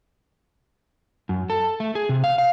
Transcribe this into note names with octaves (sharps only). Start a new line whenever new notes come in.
F#2
A4
A3
G#4
C3
F5
F5